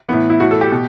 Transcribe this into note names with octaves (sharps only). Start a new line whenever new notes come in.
A2 E3 B3
E4
A2 E3 F#4
A4
G4
B2